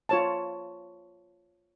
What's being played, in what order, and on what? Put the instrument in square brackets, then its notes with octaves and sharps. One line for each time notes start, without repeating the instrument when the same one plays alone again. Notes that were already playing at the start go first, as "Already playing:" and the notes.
[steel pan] F4 C#5 A5